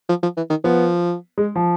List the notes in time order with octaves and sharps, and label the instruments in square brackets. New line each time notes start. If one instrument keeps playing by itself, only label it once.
[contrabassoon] F3
F3
E3
D#3
[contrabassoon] F3 [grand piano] B3
[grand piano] G#3
F3